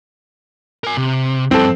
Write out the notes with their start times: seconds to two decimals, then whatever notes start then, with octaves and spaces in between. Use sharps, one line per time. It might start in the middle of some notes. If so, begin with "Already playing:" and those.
0.84 A#4 G#5
0.97 C3
1.51 G2 F3 C4 A4